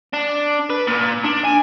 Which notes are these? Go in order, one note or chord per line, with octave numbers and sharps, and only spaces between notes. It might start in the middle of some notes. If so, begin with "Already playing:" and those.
D4
B4
A#2
D4
G#5